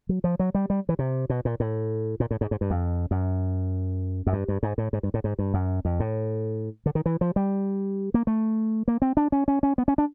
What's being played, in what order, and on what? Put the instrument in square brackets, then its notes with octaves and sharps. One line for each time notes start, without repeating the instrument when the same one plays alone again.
[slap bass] F#3
F3
F#3
G3
G3
E3
C3
B2
A#2
A2
A#2
A2
G#2
G#2
G2
F2
F#2
F#2
G2
G2
G#2
A2
G#2
G2
A2
G#2
G2
F#2
F2
A2
D3
D#3
E3
F3
G3
A#3
A3
A#3
C4
D4
C#4
C#4
C#4
B3
C#4
D4